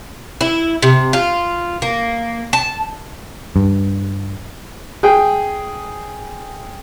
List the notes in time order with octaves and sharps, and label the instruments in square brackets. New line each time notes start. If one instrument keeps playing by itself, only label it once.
[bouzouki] E4
C3
F4
A#3
A5
[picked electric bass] G2
[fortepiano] G#4 G5